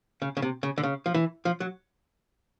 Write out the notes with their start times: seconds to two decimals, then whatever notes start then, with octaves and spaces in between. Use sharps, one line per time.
0.22 C#3
0.37 C#3
0.42 C3
0.63 C#3
0.78 D3
0.83 C#3
1.06 F3
1.14 E3
1.45 F3
1.60 F#3